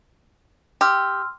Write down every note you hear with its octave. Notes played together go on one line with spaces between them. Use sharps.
G4 C6 E6 F6